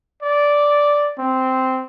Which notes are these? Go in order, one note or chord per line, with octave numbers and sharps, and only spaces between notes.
D5
C4